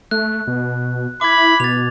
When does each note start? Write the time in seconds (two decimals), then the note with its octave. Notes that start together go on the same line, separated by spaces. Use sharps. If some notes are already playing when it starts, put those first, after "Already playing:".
0.11 A3 F#6
0.47 B2
1.21 E4 B5 D6 G#6
1.60 B2 A6 F7